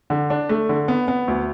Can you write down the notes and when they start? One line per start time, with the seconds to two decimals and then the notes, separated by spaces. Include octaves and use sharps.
0.10 D3
0.30 D4
0.49 A3
0.69 D3
0.88 B3
1.08 B3
1.28 D2